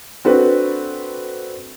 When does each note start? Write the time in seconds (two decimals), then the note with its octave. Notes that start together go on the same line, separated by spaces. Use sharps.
0.25 C4 D4 F#4 A4 B4